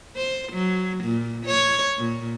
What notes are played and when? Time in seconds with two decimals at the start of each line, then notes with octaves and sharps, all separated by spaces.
0.17 C5
0.53 F#3
1.04 A#2
1.46 C#5
1.97 A#2